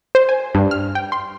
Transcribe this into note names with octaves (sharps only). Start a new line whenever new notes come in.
C5
G#5
G2
F6
G5
C6